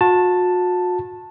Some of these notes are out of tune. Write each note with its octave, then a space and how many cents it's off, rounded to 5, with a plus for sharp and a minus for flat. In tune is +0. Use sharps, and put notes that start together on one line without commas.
F#4 -40 A5 +5